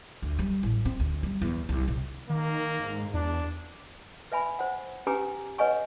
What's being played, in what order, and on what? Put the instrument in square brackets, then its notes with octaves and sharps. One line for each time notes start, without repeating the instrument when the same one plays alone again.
[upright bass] D2
G3
A1
C4
D2
G3
E2
C2
C3
[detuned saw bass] D#3 [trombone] A#3
[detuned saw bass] G#2
[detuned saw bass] E2 [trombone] D4
[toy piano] B4 E5 G#5 B5
C5 F#5
C#4 G4 B4 G#5 A#5 D6
B4 C#5 D#5 F#5 G#5 C#6